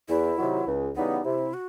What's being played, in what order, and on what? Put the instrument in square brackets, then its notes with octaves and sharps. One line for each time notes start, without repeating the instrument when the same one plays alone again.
[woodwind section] E2 [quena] E4
[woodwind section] C3 D#3 F#3
C#2
[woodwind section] C#3 E3 G3 B3 [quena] D#4
[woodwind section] C3 [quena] E4
[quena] F#4